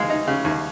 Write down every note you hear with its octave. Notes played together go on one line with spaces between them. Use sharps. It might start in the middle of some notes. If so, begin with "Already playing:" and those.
Already playing: D#2 G#3 F5
D#4
C#3
D#2